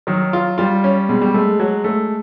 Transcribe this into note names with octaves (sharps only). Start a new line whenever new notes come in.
D#3 F#3
F4
G3 F4
C#4
B2 G#3
G3
G#3 A3
F#3
A3